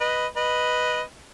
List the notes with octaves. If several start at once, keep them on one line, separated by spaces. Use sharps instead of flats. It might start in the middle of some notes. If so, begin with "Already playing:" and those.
B4 D#5
B4 D#5